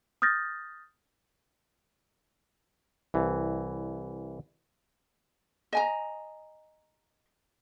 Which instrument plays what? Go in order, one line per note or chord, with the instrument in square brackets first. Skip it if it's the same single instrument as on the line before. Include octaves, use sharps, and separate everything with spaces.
[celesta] D#6 F6 G6 A6 A#6
[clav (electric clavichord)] C2 E3
[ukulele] D#5 G#5 A#5